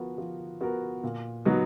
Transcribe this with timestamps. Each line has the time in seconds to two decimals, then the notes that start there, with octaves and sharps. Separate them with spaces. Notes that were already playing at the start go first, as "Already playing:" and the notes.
Already playing: F3 B3 F#4 A#4
0.18 F3
0.61 B3 F#4 A#4
1.03 A#2
1.45 F#3 B3 D#4 F#4